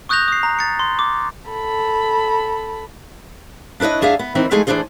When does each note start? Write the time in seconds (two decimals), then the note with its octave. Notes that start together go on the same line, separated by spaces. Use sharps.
0.09 C#6 D#6 F#6 G6 A#6 F7
0.28 D#6 C7
0.43 A#5
0.59 A6 C#7
0.79 C6
0.99 D6
1.50 A4 B5
3.80 D4 E4 B4 C#5 D#5
4.02 F#2 D4 G#4 E5 F5
4.19 B3
4.35 D#3 E3 C4 D#4
4.51 F3 G#3 A3 D#4 G#4 G#5
4.67 E3 G3 A3 D4 G#4 C5